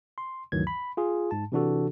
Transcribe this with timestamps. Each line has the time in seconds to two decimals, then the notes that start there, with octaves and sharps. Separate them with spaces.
0.18 C6
0.52 D2 G2 D#3 E3 F#3 G#6
0.67 B5
0.97 F4 G#4
1.31 G#2 A5
1.52 C3 E3 D4 F#4 A4